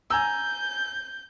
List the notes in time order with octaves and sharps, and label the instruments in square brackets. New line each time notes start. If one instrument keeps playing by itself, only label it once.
[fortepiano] G#5 A#5 E6 [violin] G6